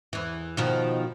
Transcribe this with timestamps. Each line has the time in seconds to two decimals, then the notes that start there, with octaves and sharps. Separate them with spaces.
0.13 E2 E3
0.57 B2 D#3 F3